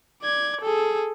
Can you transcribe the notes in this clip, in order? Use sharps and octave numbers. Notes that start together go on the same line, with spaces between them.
D5 G#6
G#4 A4